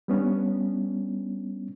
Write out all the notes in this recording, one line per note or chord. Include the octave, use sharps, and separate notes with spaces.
G3 B3 C#4 D4